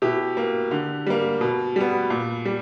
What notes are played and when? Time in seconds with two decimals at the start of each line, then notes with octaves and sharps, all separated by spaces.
0.02 B2 E4 G4
0.37 A#3
0.71 D3
1.06 G3 A#3
1.41 B2
1.76 G3 B3
2.10 A#2
2.45 G3